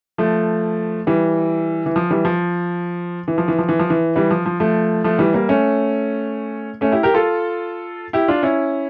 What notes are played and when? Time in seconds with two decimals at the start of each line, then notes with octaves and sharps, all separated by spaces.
0.18 F3 A3
1.07 E3 G3
1.86 E3
1.96 F3
2.10 E3 G3
2.25 F3
3.28 E3
3.38 F3
3.48 E3
3.58 F3
3.69 E3
3.79 F3
3.90 E3
4.16 E3 G3
4.30 F3
4.46 F3
4.60 F3 A3
5.04 F3 A3
5.19 E3 G3
5.34 G3 A#3
5.49 A3 C#4
6.81 A3 C#4
6.92 E4 G4
7.03 G4 A#4
7.14 F4 A4
8.13 E4 G4
8.28 D4 F4
8.43 C#4 E4